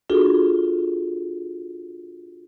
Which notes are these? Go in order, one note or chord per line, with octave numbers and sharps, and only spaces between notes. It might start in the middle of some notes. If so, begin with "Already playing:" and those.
D4 F4 F#4 G#4 A4